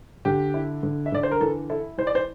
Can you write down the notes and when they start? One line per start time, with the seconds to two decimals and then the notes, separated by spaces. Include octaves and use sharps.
0.25 D3 G4
0.54 E4
0.83 D3
1.06 E5
1.12 D3 D5
1.23 C5
1.31 A#4
1.41 E3 A4
1.70 E4 A4
1.98 E3 C5
2.07 D5
2.15 C5